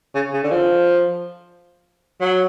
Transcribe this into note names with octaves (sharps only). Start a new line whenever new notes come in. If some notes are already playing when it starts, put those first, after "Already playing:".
C#3
C#3
D3
F3
F#3